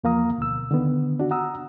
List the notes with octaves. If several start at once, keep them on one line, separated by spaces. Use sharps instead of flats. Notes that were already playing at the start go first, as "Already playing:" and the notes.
E2 F3 A#3 F5 A#5 D#6
D2 B2 E6
D3 D#3 B3
D4 F#4
F#5 A#5 D#6 E6